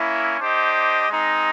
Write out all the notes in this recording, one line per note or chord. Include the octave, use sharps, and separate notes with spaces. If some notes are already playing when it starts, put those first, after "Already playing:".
Already playing: A#3 C#4 E4
D4 G4 C5 D#5
G#3 C4 D#4